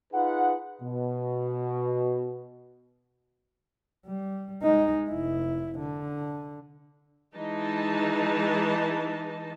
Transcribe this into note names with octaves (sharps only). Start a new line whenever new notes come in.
D#4 F4 G#4 B4 F#5
B2
G3
G#3 D#4
F1 E4
D3
E3 G#3 D#4 A5